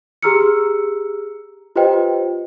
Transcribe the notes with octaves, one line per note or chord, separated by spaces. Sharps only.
G4 G#4 A#5 E6 F6 C#7
F4 G4 B4 C5 D#5 G5